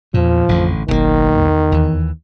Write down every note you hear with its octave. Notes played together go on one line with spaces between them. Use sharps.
E2 A#2 F3
A1 F2 D3
F#1 B1 D#3 F3 A#3
E2
D#2 E3